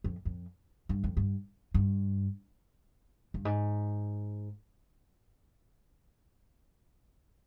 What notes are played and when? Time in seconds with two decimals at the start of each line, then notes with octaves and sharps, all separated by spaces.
0.04 F2
0.25 F2
0.89 G2
1.04 F2
1.17 G2
1.74 G2
3.34 G2
3.45 G#2